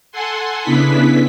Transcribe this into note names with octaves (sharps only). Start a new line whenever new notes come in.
A4 F#5 G#5 C6
C#3 B3 D4 E4 B4 B6